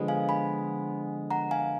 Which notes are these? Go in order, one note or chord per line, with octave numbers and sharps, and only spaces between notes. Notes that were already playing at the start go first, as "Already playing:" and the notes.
Already playing: D3 F3 G#3 B3
F5 G#5
G#5 B5
F#5 A#5
F5 G#5